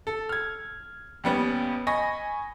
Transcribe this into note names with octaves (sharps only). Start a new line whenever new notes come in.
A4
F6 G#6
D#2 G3 B3 C#4
D#5 G#5 B5 C#6 A#6